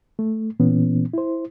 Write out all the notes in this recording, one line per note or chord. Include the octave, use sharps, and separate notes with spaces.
A3
A#2 E3 B3 C#4
E4 C5